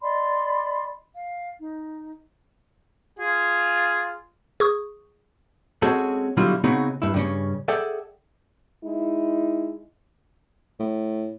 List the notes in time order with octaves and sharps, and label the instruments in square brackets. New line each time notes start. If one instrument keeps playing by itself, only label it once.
[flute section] D5 D#5 B5 C6
F5
D#4
[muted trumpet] F4 [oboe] G#4
[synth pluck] G#4 C#6 D#6
[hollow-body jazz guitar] G#3 C4 C#4 F#4 G#4 A4
B2 D3 F#3 G3 E4 F4
C#3 B3 C4 D#4 F#4 G#4
G2 E4
G2 C#3 C#4
G#4 A4 D5 E5 F#5 G5
[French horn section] G#3 D#4 E4
[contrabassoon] A2